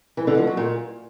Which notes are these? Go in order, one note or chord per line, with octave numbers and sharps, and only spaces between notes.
E3
D3
F3
F#3
A#2